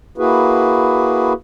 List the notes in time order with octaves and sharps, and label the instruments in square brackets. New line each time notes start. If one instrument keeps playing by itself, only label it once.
[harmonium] A#3 E4 F#4 G#4 B4